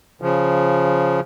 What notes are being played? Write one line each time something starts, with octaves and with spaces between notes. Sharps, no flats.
C#3 F3